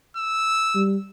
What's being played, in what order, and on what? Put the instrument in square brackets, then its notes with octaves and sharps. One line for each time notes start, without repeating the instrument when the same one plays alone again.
[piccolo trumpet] E6
[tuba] G3